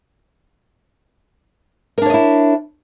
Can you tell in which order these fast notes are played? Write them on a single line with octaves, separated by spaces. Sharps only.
A#4 D4 C#5 D#5 E4